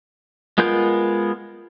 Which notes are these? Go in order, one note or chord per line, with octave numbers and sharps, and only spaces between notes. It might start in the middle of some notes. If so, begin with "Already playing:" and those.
G#3 B3 F4 A#4 G6